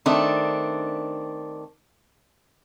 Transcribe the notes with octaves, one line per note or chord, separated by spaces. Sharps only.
D#3 A3 C4 D4